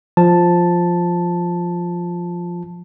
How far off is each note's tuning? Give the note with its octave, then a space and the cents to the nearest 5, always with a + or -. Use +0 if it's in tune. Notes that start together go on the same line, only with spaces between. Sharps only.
F3 +0 A5 +0